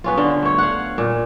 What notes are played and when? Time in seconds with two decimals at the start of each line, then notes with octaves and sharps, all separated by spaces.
0.04 B3 C#4 F4
0.17 D3
0.42 A3 C#5
0.58 F5 F#5
0.98 A#2